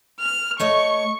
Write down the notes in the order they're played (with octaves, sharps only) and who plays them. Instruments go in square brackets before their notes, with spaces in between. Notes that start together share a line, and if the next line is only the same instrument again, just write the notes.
[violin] F6
[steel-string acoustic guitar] A3 C#5 D#5 [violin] C#6